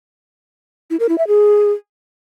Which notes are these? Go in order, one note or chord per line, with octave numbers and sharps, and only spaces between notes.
E4
A#4
E4
E5
G#4